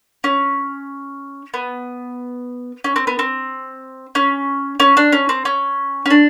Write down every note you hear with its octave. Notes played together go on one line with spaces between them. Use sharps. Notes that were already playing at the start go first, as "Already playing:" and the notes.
C#4
B3
C#4
C4
B3
C4
C#4
C#4
D4
C#4
C4
C#4
C#4
D4